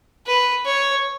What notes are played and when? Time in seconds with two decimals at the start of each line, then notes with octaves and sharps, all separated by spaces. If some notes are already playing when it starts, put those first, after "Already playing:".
0.26 B4
0.65 C#5